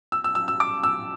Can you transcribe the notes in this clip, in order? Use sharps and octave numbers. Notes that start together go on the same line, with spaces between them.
E6
E6
E6
E6
D6
E6